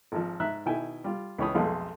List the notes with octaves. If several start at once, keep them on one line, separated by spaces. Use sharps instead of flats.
G#1 F3
G#2 E5 A#5 F#6
B2 D#3 E4 G5 G#5
G3 F4
C#2 E3 C#5 B5 D#6
B1 F2 G#3 A3 F5